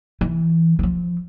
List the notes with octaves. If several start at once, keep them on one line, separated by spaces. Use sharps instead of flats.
E3
E3
F3